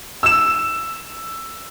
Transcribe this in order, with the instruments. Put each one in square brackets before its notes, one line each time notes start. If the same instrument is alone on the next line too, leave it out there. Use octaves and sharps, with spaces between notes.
[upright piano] E6 E7